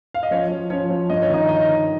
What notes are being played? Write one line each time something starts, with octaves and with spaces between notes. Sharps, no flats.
F5
D#5
F3 C#4 C#5
F3
F3 C#4 C#5
F3
G2 D#5
C#5
D#3 D#4 D#5
D#3 D#4 D#5
D#3